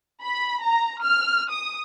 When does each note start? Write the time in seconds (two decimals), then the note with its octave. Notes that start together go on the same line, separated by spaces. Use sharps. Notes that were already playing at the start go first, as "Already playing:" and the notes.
0.22 B5
0.62 A#5
1.04 F6
1.51 D#6